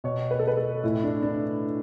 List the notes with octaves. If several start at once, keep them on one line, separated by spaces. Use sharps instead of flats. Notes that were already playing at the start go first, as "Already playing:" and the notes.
B2 C#5
B4
A4
B4
A4
A2 E3 E4
D4
D4